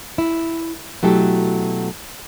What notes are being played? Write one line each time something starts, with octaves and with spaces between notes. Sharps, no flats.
E4
B2 F#3 A3 E4 G4 A4